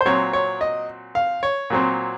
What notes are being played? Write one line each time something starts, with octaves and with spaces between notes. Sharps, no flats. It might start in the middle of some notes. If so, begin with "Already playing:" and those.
C5
A#2 F#3 C4 C#5
C#5
D#5
F5
C#5
A#2 F#3 C4